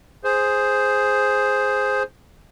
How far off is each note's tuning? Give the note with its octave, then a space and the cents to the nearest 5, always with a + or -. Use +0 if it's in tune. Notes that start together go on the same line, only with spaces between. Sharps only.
G#4 +0 C5 +0